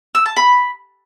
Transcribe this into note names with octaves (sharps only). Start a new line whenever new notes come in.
E6
A5
B5